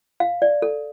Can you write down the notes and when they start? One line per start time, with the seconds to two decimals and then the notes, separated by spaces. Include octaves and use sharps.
0.20 F5
0.42 D5
0.62 A4